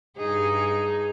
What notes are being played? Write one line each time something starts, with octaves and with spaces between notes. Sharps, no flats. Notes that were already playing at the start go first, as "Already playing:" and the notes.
G2 D#4 G#4